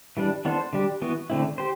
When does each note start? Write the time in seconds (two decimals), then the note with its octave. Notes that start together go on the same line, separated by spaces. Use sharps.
0.17 E3 G3 D4
0.45 E3 B3 D4 A4 C5
0.73 D3 G3 D4 G4
1.02 E3 B3 F#4
1.30 D3 A3 C4 E4
1.58 G4 C5